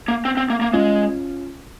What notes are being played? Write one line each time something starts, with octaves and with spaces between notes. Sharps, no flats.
A#3
C4
C4
A#3
A#3
G#3 C#4 F4